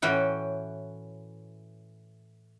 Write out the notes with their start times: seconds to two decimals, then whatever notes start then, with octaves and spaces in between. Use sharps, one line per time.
0.02 A2 E3 C#4 F#4 G5